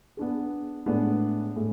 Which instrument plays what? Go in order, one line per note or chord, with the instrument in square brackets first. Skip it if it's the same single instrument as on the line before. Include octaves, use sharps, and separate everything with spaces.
[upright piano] B3 D4 G#4
A2 G#3 B3 D4
A2 G#3